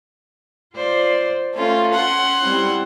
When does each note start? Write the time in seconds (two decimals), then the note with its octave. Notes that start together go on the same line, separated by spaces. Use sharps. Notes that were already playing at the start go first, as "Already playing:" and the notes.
0.75 F4 C5 D5
1.55 A3 C#4 F4
1.93 F#5 C6
2.42 G3 C4 E4